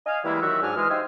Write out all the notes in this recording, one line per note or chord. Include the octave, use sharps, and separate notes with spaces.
D#5 F5 G#5
E3 G3 G#3 A#3 E4
D#3 F#3 F#4 G4 E5
G#2 F#3 D4 G#5 F6
E3 G#3 F6
D#4 G4 C5 E5 F5 G#5